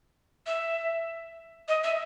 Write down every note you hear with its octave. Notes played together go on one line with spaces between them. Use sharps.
E5
D#5
E5